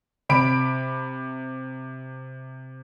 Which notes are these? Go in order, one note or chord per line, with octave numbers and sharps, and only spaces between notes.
C3 B5 D7